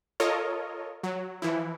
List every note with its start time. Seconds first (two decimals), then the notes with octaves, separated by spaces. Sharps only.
0.20 F4 A4 A#4 C#5 D#5
1.03 F#3
1.42 E3 F3 E4